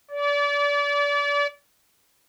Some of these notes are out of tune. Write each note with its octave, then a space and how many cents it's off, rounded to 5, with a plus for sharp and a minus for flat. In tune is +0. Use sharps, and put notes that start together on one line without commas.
D5 -35